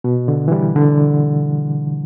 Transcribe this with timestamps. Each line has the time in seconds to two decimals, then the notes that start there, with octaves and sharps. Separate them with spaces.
0.04 B2
0.28 D3
0.48 E3
0.52 G3
0.76 D3